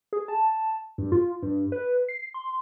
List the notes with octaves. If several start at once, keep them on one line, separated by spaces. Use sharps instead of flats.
G#4
A5
G2
F4
G2
B4
C7
C6